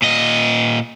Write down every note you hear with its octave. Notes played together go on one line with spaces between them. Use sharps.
A#2 D#5